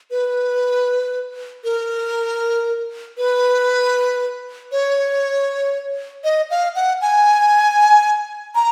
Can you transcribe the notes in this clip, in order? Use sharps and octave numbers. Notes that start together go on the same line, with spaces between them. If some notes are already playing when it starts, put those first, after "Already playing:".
B4
A#4
B4
C#5
D#5
F5
F#5
G#5
A#5